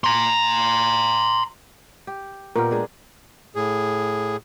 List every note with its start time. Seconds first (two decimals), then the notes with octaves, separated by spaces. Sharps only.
0.04 A#5 C6
2.07 G4
2.56 A#2 B3 G4 A#4
2.71 G#3 D4 G#4
3.55 A2 G#4